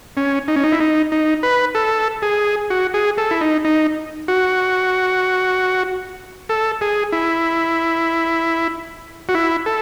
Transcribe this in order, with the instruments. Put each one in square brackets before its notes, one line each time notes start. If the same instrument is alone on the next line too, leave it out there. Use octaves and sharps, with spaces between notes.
[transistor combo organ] C#4
D#4
C#4
D#4
E4
D#4
D#4
B4
A4
G#4
F#4
G#4
A4
E4
D#4
D#4
F#4
A4
G#4
E4
F#4
E4
A4